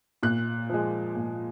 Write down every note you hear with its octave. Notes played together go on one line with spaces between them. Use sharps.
A#2 F#6
F3 G#3
A#2